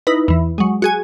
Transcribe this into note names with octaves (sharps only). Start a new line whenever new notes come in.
D#4 E4 B4
E2 E3
F#3 G#3
F#4 G#4 G#5